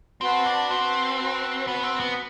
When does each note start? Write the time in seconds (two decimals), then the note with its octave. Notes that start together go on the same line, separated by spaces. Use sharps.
0.21 C4 F#4 B4 F#5 A5
0.46 D4
0.70 C4 F#4 B4 F#5 A5
1.19 F#4 B4 F#5 A5
1.67 B3 F#4 B4 F#5 A5
1.84 C4
2.00 B3